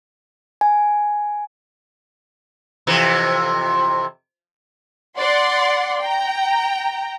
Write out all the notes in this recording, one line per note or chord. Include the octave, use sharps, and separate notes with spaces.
G#5
F2 C3 E3
D5 F#5 C6
G5 A#5